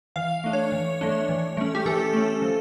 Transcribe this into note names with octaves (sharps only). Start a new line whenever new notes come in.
E3 F5
A3 D4
C#5
E3
A3 D4
E3
A3 C#4
G4
E3 A4
A3 C#4
F3